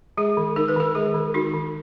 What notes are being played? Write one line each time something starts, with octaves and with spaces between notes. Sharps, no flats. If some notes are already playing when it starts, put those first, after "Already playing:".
G#3 G#4
D#3
D#4 A#4
B4
D#3 A#4
G#3 G#4
D#3
D#4 F#4
D#3